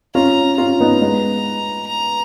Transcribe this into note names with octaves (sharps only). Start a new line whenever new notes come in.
C#4 F4 A#5
C#4 F4 A#5
B3 D#4
G#3 B3
A#5